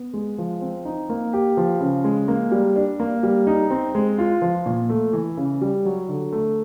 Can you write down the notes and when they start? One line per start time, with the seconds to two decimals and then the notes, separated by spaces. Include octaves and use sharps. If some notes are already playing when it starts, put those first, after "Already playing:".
Already playing: B3
0.14 G#3
0.38 F3
0.61 C4
0.85 D#4
1.09 A#3
1.33 G4
1.57 F3
1.80 C#3
2.04 G#3
2.28 A#3
2.52 G3
2.76 D4
3.00 A#3
3.23 G3
3.47 D#4
3.70 C4
3.95 G#3
4.18 F4
4.42 F3
4.66 A#2
4.89 A3
5.13 E3
5.37 C#3
5.61 G3
5.85 F#3
6.09 D3
6.32 A3